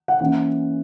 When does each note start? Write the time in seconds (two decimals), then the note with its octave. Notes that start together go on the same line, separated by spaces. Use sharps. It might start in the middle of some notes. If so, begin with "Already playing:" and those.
0.08 F#5
0.20 E3 A#3 C#4 F#5